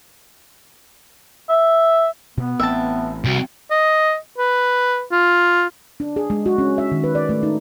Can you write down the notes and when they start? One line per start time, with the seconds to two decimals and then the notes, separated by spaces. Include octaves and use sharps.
1.49 E5
2.37 B2 B3
2.60 A1 C4 E5 G5 A5
3.25 C2 F#4
3.71 D#5
4.38 B4
5.12 F4
6.00 D4
6.16 G#4
6.30 G#3
6.46 F#4
6.58 C#4
6.78 E5
6.92 D#3
7.04 B4
7.15 D5
7.29 A3
7.43 D#4